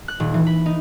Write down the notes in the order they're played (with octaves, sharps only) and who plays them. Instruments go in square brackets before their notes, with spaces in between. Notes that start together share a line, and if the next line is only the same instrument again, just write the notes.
[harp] F#6
D#1
E3
B5
D#4